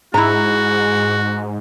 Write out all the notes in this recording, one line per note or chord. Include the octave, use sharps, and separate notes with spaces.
G#2 G#3 E4 F#4 A#5